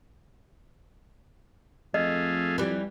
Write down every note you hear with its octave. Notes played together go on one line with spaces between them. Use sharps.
F2 A3 G#4 D#5 F5
E3 G3